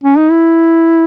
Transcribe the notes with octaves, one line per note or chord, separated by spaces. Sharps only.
C#4
D#4
E4